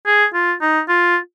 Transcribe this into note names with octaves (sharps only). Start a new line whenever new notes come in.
G#4
F4
D#4
F4